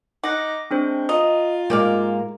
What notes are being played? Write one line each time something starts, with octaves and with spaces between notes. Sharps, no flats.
D#4 F#5 D6 A#6
G#3 C4 D4 C5
F4 D#5 A#5
G#2 G#3 A#3 G4 D5 F5